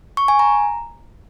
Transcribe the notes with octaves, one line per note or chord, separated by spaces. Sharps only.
C#6
G#5
A#5